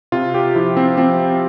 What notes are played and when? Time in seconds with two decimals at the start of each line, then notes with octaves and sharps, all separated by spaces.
0.12 C3 F4
0.34 G4
0.55 F3 E4
0.77 C4
0.97 F3 C4